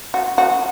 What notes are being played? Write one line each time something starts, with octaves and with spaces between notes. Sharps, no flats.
F#4
F#4